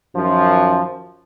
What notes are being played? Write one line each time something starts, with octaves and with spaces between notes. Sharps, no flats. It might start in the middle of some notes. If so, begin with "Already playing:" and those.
F#2 D#3 F3